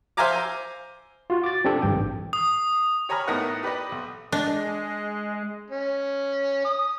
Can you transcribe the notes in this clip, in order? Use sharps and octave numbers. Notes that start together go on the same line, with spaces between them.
C5 E5 F5 G#5 A#5 D6
F4 F#4
D6 A6
C4 D4 G4 A4
G#1 G2 G5
A1
D#6
G4 C#5 G#5 A#5 B5 F6
A2 B3 D#4 A#4 D#5 F#5
G4 B4 D5 D#5 B5
B1
G#3 D4 D#5
C#4
D#6